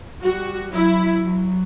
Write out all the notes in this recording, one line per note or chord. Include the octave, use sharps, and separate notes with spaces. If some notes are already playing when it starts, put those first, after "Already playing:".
G3 F#4
F#3 E4
F#3